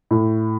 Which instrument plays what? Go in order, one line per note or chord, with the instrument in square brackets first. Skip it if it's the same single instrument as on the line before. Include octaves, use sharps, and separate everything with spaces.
[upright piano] A2